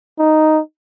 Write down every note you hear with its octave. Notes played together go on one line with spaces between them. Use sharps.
D#4